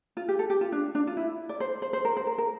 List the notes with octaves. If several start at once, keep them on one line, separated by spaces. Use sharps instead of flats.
F4
G4
A4
G4
F4
D4
D4
F4
E4
D5
C5
C5
C5
A#4
C5
A#4
A#4